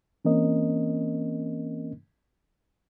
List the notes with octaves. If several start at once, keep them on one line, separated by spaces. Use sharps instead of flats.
E3 A#3 C4 C#4 A#4 D#5